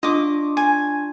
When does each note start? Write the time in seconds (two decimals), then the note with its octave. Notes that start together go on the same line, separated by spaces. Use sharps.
0.03 D4 F4 D#5 C#6 D6
0.57 G#5